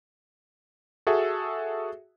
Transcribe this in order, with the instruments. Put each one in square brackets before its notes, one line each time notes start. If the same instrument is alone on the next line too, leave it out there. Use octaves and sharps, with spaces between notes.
[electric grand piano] F#4 G#4 A4 E5